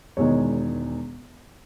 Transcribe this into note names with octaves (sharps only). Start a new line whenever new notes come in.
E1 E2 D#3 G#3 C#5